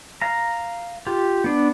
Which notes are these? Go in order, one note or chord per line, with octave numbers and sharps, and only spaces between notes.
F5 A#5
F4 G4
B3 D4